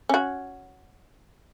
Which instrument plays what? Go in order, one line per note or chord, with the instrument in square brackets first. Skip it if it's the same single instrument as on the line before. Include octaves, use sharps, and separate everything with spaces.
[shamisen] C#4 F#4